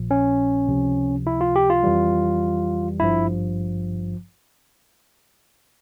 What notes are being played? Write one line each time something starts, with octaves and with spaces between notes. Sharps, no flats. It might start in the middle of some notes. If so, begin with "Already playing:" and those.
Already playing: A#1 A#2 F3
C#4
C#2 C3 F3
E4
F4
G4
F4
F2 E3 G3
G#1 G2 F3 E4